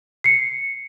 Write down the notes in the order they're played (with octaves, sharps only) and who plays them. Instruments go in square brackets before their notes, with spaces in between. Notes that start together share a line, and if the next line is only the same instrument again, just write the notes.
[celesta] C7 C#7